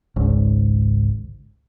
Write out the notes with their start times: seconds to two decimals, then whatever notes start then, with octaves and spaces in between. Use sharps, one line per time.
0.16 G#1 C#2 G#2